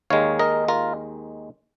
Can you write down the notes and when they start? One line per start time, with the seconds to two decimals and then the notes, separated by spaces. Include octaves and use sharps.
0.10 D#2 D#3 G#3 C#5 F5
0.39 A#4 D#5
0.68 F4 A#4